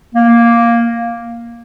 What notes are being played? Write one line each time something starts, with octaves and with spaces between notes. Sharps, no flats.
A#3